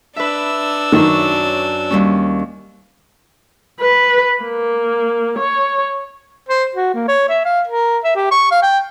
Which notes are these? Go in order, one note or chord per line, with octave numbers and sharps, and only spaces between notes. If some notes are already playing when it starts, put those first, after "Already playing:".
D4 B4 E5 E6
F#2 D#3 C#5 A5
D#2 G3 C#4
B4
A#3
C#5
C5
F#4
A#3
C#5
E5
F5
A#4
E5
G4
C#6
F5
G5